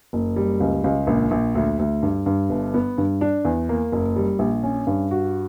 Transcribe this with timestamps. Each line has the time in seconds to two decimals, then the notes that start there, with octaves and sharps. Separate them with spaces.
0.13 F#1
0.36 G3
0.60 C#2
0.84 C#2
1.07 A#1
1.31 A#1
1.55 D2
1.79 D2
2.03 G2
2.26 G2
2.49 G1
2.74 B3
2.98 G2
3.21 D4
3.45 E2
3.69 A#3
3.92 F#1
4.16 G3
4.39 A#1
4.63 C#4
4.87 G2
5.11 F#4